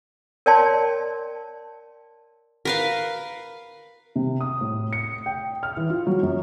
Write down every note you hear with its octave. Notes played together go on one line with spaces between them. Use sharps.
A#4 C#5 D5 G5 A5 C6
A#4 B4 F5
C3
D#6
A2
C#7
G5
F6
E3
F4
F#3
F#2